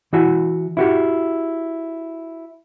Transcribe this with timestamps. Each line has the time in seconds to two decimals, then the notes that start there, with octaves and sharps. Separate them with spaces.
0.13 E3 E4 F#4 G#5
0.77 E4 F#4 G4